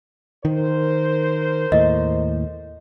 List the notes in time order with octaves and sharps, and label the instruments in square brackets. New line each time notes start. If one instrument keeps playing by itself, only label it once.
[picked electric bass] D#3 [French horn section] A#4 C5
[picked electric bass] D#2 A2 [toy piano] D#5